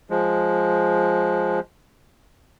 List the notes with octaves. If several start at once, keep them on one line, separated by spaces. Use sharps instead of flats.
F3 G#3